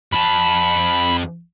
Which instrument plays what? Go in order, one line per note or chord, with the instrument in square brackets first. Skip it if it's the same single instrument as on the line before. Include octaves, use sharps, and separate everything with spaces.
[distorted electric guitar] F2 A5 [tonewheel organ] B5